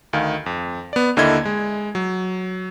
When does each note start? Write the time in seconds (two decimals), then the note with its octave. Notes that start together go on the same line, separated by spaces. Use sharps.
0.13 D2 D#3 F5
0.46 F2
0.93 B3 D5
1.17 D#2 D3 A#3 E4 D#5 G#6
1.45 G#3
1.95 F#3